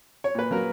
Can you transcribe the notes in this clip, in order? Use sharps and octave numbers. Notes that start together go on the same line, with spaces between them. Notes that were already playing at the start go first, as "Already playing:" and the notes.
C#5
A#2 B4
F#3 A#3 A#4